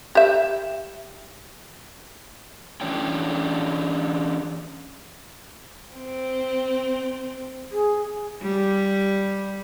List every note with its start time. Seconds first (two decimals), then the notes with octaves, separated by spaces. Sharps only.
0.15 G4 E5
2.81 E3 C#4 D4 C#5 G5
5.97 C4
7.72 G#4
8.42 G3